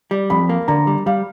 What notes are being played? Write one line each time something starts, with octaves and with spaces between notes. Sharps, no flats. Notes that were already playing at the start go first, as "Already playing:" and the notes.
G3
F2 B5
A#3
D3 A#5
G3
G3 F5